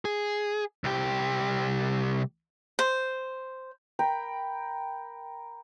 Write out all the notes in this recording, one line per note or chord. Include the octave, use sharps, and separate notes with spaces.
G#4
C2 G4
C5
A#4 G5 B5